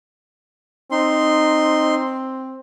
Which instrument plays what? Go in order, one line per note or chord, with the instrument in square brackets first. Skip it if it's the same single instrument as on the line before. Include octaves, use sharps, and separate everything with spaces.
[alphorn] C4 [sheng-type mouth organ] D#4 C6